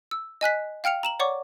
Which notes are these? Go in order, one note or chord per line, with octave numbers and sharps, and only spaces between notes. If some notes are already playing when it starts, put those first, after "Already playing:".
E6
D#5 G#5 F#6 B6
F5 G5 F6 C#7 F7
A#5 E7 F#7
C#5 D5 F#5 C#6 D6